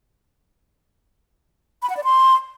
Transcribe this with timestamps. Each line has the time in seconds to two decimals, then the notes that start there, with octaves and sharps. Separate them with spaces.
1.82 B5
1.90 F#5
1.97 D5
2.04 C6